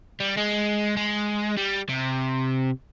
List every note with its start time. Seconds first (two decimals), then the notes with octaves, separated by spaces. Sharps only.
0.20 G3
0.37 G#3
0.97 G#3
1.57 G3
1.89 C3